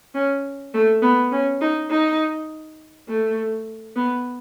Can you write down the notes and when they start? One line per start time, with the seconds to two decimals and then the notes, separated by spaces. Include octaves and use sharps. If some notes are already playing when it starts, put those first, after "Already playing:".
0.14 C#4
0.74 A3
1.02 B3
1.31 C#4
1.61 D#4
1.90 D#4
3.08 A3
3.96 B3